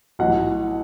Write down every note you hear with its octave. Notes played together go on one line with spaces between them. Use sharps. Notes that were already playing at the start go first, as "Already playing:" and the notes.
B1 A2 E3 F#5